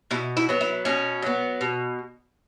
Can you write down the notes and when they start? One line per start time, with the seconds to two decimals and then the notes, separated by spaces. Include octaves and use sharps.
0.11 B2 E4
0.37 E4
0.49 F#3 B3
0.61 E4
0.85 B2 C#4
1.22 F#3 B3
1.61 B2